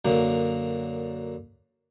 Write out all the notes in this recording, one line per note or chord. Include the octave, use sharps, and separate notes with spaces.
F#2 D3 A#3